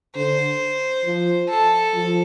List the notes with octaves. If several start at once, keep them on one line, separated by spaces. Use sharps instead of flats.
D3 C5
F3
A4
F3